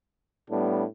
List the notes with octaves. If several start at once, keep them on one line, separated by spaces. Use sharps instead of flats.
A2 G3 B3 D4